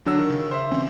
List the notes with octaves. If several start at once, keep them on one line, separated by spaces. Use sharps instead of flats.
D3 F#3 D4 E6
D#3
C#3
C5 E5
E3 C4 C#4